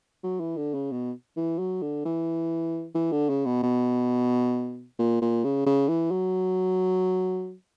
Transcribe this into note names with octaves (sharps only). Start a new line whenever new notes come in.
F#3
E3
D3
C#3
B2
E3
F#3
D3
E3
E3
D3
C#3
B2
B2
A#2
A#2
C#3
C#3
E3
F#3